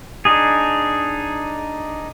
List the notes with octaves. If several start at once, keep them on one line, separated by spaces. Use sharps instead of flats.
D4 D#4 G#4